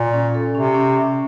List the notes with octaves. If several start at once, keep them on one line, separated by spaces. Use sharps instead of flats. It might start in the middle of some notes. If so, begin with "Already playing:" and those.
Already playing: A#2
C#4
A4
C3 C#4
C#4
C#4